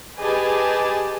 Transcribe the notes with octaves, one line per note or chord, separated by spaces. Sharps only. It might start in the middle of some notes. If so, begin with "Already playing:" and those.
G4 G#4 B4 D#5 G#5 A5